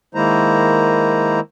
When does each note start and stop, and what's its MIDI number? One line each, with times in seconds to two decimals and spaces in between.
0.15 1.40 51
0.15 1.40 56
0.15 1.40 58
0.15 1.40 64
0.15 1.40 72
0.15 1.40 82